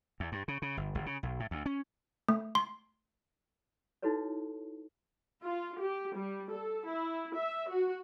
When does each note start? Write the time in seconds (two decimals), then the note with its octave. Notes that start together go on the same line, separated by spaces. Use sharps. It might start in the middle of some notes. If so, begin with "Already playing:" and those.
0.20 E2
0.32 G2
0.48 C#3
0.62 C#3
0.77 G1
0.95 G1
1.06 C#3
1.23 B1
1.40 A2
1.51 D2
1.66 C#4
2.29 A3
2.55 C6
4.02 D#4 E4 F#4 A4 B4 C#5
5.43 F4
5.82 G4
6.14 G3
6.52 A4
6.89 E4
7.37 E5
7.69 F#4